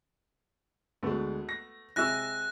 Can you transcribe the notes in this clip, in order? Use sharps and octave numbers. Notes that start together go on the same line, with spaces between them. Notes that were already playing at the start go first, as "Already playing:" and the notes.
D2 G#3 A3 B3
A#6
C3 G#3 E4 E5 G#5 E6 F#6 A#6